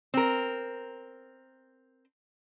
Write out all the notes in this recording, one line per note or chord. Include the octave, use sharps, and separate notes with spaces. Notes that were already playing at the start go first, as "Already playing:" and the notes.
C4 A#4